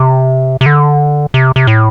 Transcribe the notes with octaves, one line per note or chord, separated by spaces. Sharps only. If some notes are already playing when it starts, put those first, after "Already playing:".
Already playing: C3
C3
D3
C3
C3
A2